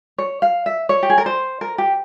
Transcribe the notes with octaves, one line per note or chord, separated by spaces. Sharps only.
C#5
F5
E5
C#5
G4
G#4
A#4
C5
A#4
G4